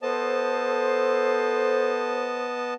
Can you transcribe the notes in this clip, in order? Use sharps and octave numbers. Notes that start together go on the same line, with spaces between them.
B3 A4 C5 D#5 A5